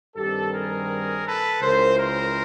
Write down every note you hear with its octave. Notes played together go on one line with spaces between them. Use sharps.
G2 D#3 G3 C4 G4 A4
G#4 A#4
A4 B4
C#2 C#3 E3 A#4 C5
A#4 C5